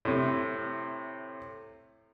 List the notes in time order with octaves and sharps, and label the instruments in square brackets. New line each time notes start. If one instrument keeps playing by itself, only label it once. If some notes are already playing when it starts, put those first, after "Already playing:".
[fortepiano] A2 C3